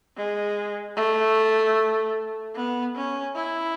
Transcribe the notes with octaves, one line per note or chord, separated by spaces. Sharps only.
G#3
A3
B3
C#4
E4